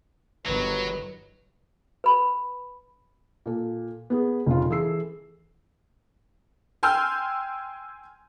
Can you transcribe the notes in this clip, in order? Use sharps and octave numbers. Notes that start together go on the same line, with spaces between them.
G1 D#3 F#3 B4
B4 B5
A#2 A4
B3 G#4
F1 C#3 F4
E3 G#4 A4 E6 C7
G5 G#5 C6 E6 F6 G6